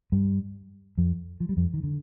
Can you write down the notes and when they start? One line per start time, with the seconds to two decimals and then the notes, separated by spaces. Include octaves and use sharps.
0.12 G2 G3
0.98 F2 F3
1.40 F3
1.49 G3
1.57 F2 F3
1.74 D#3
1.83 D3